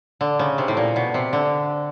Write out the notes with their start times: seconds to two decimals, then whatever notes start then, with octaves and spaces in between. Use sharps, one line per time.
0.21 D3
0.39 C#3
0.58 C3
0.68 A2
0.77 A#2
0.96 B2
1.14 C3
1.33 D3